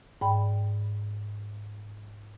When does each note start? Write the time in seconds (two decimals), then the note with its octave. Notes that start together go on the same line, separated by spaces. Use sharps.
0.21 G#2 D5 G5 B5